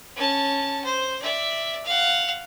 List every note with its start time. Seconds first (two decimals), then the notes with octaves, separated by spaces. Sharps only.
0.16 C#4 A5
0.84 C5
1.22 D5 E5
1.85 F5 F#5